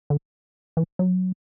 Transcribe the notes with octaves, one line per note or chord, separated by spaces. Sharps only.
D3
E3
F#3